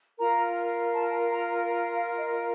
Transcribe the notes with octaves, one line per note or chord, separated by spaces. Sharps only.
F4 A#4 A#5
A5
A#5
A#5
F5
D#5